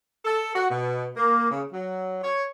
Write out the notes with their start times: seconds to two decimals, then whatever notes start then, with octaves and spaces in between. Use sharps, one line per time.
0.25 A4
0.54 F#4
0.70 B2
1.16 A#3
1.49 C#3
1.72 F#3
2.23 C#5